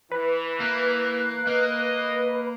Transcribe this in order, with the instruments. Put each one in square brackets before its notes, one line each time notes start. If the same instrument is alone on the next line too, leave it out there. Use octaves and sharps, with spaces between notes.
[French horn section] E3 [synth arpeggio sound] B4
[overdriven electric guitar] A#3 [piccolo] F#6
[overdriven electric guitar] A#3 [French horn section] D#5